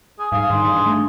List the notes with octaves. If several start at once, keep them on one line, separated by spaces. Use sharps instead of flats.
G#4
G#2 G3 G#4 F5
G#2 D#3 C4 D4 C6
A1 G2
A3